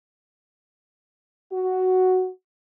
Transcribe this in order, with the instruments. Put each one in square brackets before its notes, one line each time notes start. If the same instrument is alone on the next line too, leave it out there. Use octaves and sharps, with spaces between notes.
[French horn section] F#4